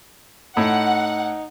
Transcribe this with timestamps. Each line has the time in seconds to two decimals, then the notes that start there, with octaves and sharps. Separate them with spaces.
0.57 A2 D#4 F#5